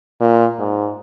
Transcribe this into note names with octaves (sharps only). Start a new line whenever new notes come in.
A#2
G#2